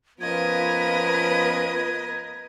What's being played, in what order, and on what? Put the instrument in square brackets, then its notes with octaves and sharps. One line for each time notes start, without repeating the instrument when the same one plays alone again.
[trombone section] F3 C#4 F4 [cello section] B3 B4 [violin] A#4 D#5 [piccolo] G#6